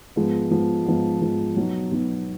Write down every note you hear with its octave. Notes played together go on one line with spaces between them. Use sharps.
G#2 F3 G#3 B3
G#2 F3 G#3 B3
G#2 F3 G#3 B3
G#2 F3 G#3 B3
B2 F#3 B3 D#4
B2 F#3 B3 D#4